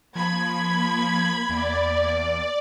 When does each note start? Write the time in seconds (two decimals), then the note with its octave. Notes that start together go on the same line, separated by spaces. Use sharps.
0.15 F3 A#3 B5 G#6
1.49 E2 D5